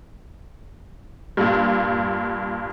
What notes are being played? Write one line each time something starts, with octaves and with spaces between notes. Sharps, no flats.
G2 A#2